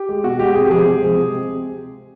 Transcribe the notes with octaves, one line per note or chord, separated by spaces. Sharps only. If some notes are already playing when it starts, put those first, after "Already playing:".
Already playing: G4
G#3
B2 F#4
G#3 G4
C3 G#4
G4
F3 G#3 G#4
C3
F3 G#3
C3